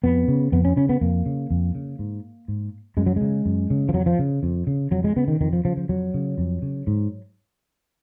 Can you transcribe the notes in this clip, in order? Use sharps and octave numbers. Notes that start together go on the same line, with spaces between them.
F2 B3
C#3
F2 B3
C#4
C#3 C#4
B3
F2 A#3
C#3
F2
C#3
G#2
G#2
F#2 G#3
F#3
C#3 G#3
F#2
C#3
F3
F2 F#3
F3
C#3
F2
C#3
F2 F#3
G#3
C#3 B3
D#3
F2 D#3
F3
C#3 F3
F3
F2 F#3
C#3
F2
C#3
G#2